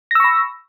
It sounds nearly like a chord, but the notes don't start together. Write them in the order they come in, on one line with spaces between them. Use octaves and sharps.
A#6 E6 C#6 B5